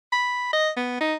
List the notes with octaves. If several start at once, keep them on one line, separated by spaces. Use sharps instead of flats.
B5
D#5
B3
D#4